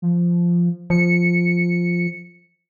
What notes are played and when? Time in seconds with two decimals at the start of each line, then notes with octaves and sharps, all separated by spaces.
0.02 F3
0.90 F3 C#7